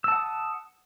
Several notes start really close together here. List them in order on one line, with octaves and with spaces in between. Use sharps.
E6 A5 F#5 D#6